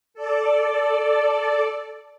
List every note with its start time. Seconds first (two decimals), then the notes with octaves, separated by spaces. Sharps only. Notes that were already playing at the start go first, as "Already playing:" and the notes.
0.14 A4 D5